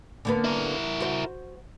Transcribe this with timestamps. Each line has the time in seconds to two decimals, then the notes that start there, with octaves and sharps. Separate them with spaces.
0.25 D3 A#3 B3
0.44 E4 A#4
1.00 F#4 C5